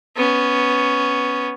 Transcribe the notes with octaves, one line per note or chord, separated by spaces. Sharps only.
B3 C#4